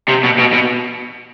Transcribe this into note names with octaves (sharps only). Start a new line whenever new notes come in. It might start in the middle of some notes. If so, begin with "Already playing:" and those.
C3
B2
B2
B2